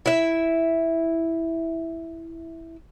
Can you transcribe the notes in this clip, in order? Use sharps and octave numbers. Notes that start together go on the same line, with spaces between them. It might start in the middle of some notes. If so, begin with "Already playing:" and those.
E4 E5